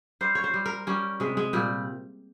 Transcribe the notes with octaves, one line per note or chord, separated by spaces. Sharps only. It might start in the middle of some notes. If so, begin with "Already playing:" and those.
G3 C5
C#5
C5
G3
A#4
G3 C#4
C3 G#3
G#3
A#2 G3